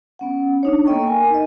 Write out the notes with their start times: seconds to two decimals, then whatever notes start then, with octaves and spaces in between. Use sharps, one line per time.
0.19 B3 C#4 F#5
0.63 D4 D#4 C#5
0.86 A#3 B3 A4 D#5 G5 C#6
1.07 A#4 G#5
1.30 D#4 D#5